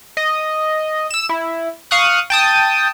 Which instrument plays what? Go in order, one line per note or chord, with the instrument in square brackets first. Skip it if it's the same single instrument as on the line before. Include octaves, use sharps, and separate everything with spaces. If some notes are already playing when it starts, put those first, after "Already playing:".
[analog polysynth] D#5
E6 E7
E4
F5 C#6 D#6 F#6
G5 A5 D#6